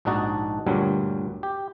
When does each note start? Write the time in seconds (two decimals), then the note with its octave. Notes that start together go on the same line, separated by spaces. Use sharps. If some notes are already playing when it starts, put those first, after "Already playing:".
0.05 A#1 G#2 D4 D#4 F#4 A5
0.67 D2 G2 A#2 F#3 G3
1.43 G4